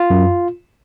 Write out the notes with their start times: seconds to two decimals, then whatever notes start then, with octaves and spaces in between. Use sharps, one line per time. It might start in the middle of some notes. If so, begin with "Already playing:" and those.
Already playing: F4
0.10 F#2